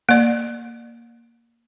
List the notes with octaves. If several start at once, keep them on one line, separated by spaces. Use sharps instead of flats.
A#3 D5